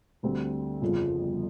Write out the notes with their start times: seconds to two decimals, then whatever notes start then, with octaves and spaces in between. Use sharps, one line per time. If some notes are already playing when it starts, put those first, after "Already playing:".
0.23 D2 D3 G3 C4
0.82 G1 F2 C#3 F3